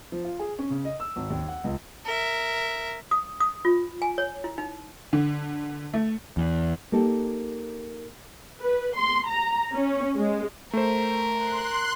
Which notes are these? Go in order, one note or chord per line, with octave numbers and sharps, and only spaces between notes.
F3
F4
G#4
C#4
C#3
D#5
E6
G#1
D#2
F#5
C#2
A#4 E5
D#6
D#6
F4
G#5
C#5
E4
D#4
D3
A3
E2
A#3 D#4 G4 A4
B4
C6
A#5
C#4
G#3
A3 A#4 C5
C6 F#6